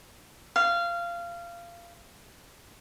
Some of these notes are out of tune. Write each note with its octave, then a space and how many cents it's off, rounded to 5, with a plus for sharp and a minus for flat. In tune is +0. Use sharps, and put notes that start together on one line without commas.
F5 -20